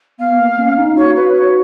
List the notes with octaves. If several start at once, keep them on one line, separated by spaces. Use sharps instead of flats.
B3 F5
A#3
C#4
D#4
F#4 C#5
B4
C#5